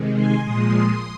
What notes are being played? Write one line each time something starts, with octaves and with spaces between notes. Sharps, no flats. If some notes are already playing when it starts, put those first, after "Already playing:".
Already playing: C3 D#3 G#3
G#5 C6
A#2 F3 G#3 C6 D#6